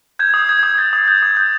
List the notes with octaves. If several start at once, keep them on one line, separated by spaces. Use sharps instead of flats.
G6 G#6
D#6
G6 G#6
D#6 G#6
G6 A6
D#6
G6
D#6
G6